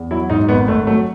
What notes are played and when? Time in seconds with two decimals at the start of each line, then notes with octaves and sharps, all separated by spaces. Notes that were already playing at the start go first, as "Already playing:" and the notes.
Already playing: E2
0.11 F#3 E4
0.30 G#2 D#4
0.48 G#1 B3
0.68 G#1 A3
0.87 F#3 A3